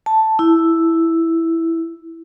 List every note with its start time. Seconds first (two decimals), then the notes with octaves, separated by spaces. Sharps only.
0.06 A5
0.39 E4